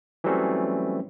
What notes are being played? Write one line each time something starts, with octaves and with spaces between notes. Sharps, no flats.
E3 F#3 G3 A3 C4 C#4